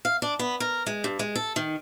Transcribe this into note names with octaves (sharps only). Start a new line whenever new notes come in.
F5
D4
B3
A#4
G#3
G2
G#3
A4
D#3